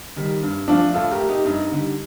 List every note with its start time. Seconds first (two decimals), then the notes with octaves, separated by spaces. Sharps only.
0.16 D#3 G3
0.43 G2
0.67 F3 A3 D4 F4
0.94 A2 F4 A4
1.12 G4 A#4
1.20 A3
1.29 D#4 G4
1.45 G2 D#4
1.71 D3 G3